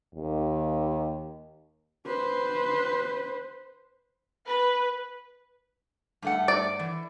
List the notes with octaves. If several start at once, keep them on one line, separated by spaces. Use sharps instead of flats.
D#2
B4 C5
B4
G2 A3 F#5
D5
E3